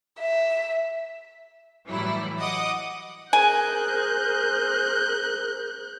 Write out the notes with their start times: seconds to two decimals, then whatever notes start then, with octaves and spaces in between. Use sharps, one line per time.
0.19 E5
1.88 A2 E3 F#3 G3 E4
2.39 D#5 F#5 D6 D#6
3.33 G#4 A#4 C5 G#5 F#6 G6